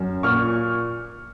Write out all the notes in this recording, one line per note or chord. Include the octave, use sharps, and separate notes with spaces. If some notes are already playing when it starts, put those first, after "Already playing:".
Already playing: F#2
A#2 C#6 F6